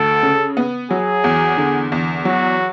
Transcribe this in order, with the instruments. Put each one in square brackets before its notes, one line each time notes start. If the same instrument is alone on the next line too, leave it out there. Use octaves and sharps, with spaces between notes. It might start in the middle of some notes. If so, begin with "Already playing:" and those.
Already playing: [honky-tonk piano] D2 [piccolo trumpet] A4
[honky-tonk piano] C#3
B3
[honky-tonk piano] F#3 [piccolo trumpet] G#4
[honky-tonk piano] E2
D3
E2
[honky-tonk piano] F#3 [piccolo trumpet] F#4